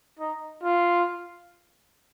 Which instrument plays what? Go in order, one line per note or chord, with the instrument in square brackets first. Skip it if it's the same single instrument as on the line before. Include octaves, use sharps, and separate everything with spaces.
[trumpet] D#4
F4